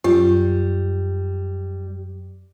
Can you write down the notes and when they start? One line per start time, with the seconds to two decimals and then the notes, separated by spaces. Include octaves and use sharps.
0.04 F#2 G3 F4